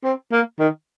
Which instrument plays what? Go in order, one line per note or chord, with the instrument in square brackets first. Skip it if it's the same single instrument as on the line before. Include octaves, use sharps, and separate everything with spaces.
[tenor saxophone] C4
A#3
D#3